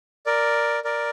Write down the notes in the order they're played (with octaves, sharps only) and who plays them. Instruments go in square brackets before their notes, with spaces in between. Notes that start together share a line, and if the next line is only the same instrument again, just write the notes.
[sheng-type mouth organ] A#4 D5
A#4 D5